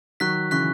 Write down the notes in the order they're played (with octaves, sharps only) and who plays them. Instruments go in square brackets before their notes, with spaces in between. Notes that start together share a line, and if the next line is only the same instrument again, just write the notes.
[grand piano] D#3 F#3 [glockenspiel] C#6 F#6 B6
[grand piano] C#3 E3 [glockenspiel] C#6 F#6 B6